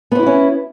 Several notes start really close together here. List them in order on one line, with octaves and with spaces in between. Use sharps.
B3 C5 E4 F#4 C#4